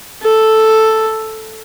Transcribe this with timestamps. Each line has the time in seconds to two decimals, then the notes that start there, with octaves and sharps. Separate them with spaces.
0.22 A4